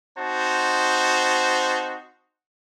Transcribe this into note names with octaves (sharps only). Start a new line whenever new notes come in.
C4 D#4 F#4 C5 A5